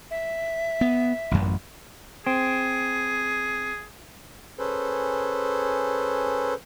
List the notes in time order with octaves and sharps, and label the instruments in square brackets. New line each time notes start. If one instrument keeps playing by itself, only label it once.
[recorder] E5
[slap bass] B3
A1 F#2
[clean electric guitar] C4 [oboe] G#4
[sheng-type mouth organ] C#4 G#4 A4 B4 C5